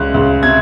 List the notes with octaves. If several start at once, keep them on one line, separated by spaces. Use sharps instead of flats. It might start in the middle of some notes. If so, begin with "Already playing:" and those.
Already playing: C#2 G#3 F#6
C#2
C3 G#6